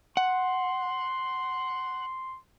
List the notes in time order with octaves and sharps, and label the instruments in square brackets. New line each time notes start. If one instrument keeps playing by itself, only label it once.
[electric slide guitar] F#5 [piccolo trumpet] C6